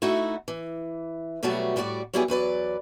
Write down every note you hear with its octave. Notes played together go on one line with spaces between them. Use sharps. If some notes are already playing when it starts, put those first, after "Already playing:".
A3 D#4 E4 F#4
E3
B2 F#3 G3 A3 B3 F#4
A2 G3 F#4 B4 D5
F#3 G3 B3 E4 G4 G#4
E2 F#3 B4 D5